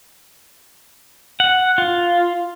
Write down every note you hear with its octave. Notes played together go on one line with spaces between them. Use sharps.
F#5
F4